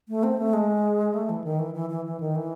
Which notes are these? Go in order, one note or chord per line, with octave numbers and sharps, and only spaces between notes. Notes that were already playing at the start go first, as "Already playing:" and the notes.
A3
C4
A3
G#3
A3
E3
D#3
E3
E3
E3
E3
D#3
E3